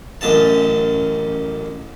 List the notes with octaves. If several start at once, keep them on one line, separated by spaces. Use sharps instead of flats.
A1 F#2 D#5 A5